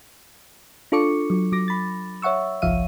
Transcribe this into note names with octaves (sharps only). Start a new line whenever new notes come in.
D4 F4 A4 C#6 D6 C#7
F#3
F#3 D6 A#6
B5 A6
C#5 E5 F#5 C#6 E6
G1 C2 F3 E5 F5 D#7